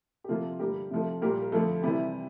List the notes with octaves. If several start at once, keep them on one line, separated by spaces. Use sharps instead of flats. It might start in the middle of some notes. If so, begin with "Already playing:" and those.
G4
C3 F3 A#3 F4 A4
G2 D3 G3 A#3 G4 A#4
C3 F3 A3
A#2 G3 A#3 G4 A#4
A#4
F2 D3 A3 F4 A4
C3 E3 G3 E4 G4